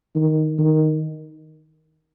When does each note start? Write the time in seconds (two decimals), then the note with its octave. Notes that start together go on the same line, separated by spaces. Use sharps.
0.15 D#3
0.58 D#3